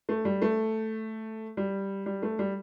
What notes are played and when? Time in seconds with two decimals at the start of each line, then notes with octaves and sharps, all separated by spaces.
0.09 A3
0.25 G3
0.42 A3
1.57 G3
2.06 G3
2.22 A3
2.39 G3